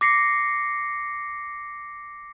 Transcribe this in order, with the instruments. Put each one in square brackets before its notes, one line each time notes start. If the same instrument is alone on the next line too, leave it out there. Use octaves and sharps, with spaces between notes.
[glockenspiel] D6 A#6 C7 C#7